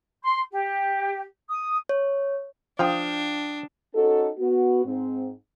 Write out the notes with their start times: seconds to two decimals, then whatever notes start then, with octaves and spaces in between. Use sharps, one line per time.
0.23 C6
0.50 G4
1.49 D#6
1.89 C#5
2.79 F3 D4 F5 G5 D#6
3.94 C#4 D#4 F#4 A4
4.39 B3 F#4
4.84 G#2 C4